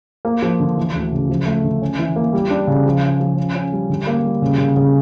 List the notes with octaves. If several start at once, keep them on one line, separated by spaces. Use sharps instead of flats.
A#3
F3
D3
E3
D2
C#3
F3
A3
D3
C#4
E3
A#3
G3
D4
C#3
F3
C#4
F3
C#4
C#4
G3
D3
A#3
G3
C#3
C#3
C#3